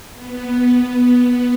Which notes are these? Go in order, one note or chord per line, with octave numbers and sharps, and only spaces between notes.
B3